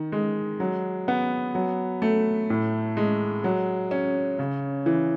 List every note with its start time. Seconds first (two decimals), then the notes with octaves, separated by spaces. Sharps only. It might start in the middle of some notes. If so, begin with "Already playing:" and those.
Already playing: D#3
0.12 G#3
0.60 F#3
1.08 B3
1.55 F#3
2.02 A3
2.50 A2
2.97 G#3
3.44 F#3
3.91 C#4
4.39 C#3
4.86 E3